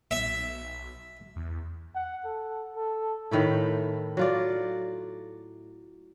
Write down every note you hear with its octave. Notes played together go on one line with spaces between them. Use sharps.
B1 E5
E2
F#5
A4
A4
A2 D#3 A3 E4
F#3 F4 D5